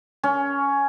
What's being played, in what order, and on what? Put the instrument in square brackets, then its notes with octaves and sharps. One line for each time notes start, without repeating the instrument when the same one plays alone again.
[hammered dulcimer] C#4